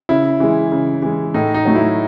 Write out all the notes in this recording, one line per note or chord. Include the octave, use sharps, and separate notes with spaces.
C#3 E4
E3 G#3
C#3
E3 G#3
A2 D#4
D#4
F#3 A3
E4